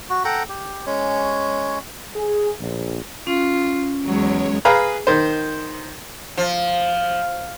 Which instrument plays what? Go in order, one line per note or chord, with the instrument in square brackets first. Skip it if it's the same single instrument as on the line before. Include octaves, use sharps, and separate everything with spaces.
[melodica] F#4
A4 F#5 G5 A#5
G4
G#3 C#4 C#5
[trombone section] G#4
A#1
[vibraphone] C#4 [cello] F4
[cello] E2 F#3 [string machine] G#3 C#5
[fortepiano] G#4 B4 F5 A#5
D#3 C5
[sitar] F3